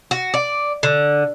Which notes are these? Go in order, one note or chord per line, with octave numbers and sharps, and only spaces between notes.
F#4
D5
D3